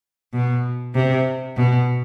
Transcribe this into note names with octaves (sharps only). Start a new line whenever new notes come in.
B2
C3
B2